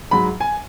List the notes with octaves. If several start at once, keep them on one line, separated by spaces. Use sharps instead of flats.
G#2 F#3 B5
G#5